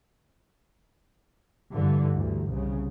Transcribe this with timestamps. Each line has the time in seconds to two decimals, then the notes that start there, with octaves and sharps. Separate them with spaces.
1.73 G2 D3 E3
2.15 D2 G2
2.48 C2 C#3